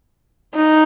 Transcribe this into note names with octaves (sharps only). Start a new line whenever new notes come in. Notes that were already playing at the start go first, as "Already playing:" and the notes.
D#4